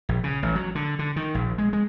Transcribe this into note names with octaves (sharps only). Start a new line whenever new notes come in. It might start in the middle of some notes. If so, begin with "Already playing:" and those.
A#1
C#3
A1
F#3
D3
D3
D#3
A#1
G#3
G#3